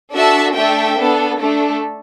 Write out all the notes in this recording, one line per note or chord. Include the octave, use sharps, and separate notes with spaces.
D4 F#4 A4 E5 A5
A3 D4 A4 E5 G5
B3 D4 A4
A3 D4 A4